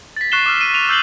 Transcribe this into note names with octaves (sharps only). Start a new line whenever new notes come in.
A6 B6
C#6 F#6 C7 E7 G7
D6 E6 F6
D#7
D#7 F7
E6 G6 C7 F#7 G7